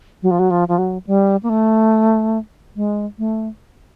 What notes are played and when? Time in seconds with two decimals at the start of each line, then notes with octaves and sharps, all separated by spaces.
0.23 F#3
0.31 F3
0.39 F#3
0.51 F3
0.68 F3
0.78 F#3
1.07 G3
1.43 A#3
1.49 A3
2.76 G#3
3.19 A3